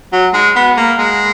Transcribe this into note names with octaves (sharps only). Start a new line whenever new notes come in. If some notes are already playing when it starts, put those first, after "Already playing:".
F#3
G#3
B3
A#3
G#3